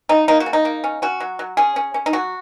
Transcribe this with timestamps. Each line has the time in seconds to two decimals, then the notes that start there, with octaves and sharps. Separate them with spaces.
0.09 C#3 D#4
0.28 A#3 D#4
0.40 F#4
0.46 C#3
0.53 D#4
0.65 A#3
0.84 C#4
1.02 C#4 F#4
1.20 F#3
1.39 F#3
1.57 C#4 G#4
1.76 C#4
1.94 C#4
2.06 D#4
2.13 F#3 F#4